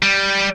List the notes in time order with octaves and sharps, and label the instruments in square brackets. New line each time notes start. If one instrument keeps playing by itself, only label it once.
[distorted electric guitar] G3